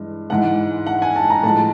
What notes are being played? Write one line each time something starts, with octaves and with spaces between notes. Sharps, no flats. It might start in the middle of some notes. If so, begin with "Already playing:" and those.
Already playing: G2 E3 G#3
G#2 E3 G#3 F#5
F#5
G#5
A5
A#5
A2 F3 G#3 A5